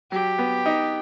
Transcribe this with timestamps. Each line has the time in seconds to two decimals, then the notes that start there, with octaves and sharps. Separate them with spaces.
0.11 F#3 G4
0.39 B3
0.66 D#4